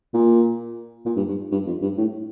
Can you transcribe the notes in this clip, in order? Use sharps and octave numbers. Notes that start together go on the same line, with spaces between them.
A#2
A#2
G2
G2
G2
F2
G2
A2